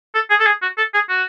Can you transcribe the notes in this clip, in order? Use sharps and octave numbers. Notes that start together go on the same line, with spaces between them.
A4
G#4
A4
G#4
F#4
A4
G#4
F#4